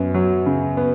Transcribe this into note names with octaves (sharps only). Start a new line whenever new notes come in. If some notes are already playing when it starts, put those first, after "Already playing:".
Already playing: F#2 B3
F#3
C#3
B3